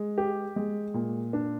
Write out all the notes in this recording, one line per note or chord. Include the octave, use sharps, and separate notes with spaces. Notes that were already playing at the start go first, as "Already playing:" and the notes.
Already playing: G#3
G4
G#3
A#2
D4